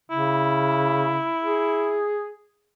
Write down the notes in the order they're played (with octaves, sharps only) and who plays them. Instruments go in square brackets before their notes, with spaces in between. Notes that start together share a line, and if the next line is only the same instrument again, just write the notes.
[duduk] C#3 [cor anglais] E4
[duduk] G#4